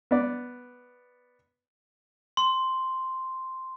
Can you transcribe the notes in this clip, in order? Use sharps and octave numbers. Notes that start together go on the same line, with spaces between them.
B3 D5
C6